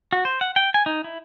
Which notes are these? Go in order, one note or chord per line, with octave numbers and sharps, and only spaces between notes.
F#4
C5
F#5
G5
G#5
D#4
E4